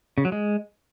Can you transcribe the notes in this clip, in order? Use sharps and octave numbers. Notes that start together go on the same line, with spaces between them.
C#3
F#3
G#3